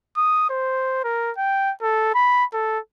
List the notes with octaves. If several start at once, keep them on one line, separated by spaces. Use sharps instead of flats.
D#6
C5
A#4
G5
A4
B5
A4